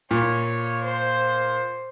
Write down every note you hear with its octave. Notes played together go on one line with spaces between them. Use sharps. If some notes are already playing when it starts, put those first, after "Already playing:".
A#2 C#5
C5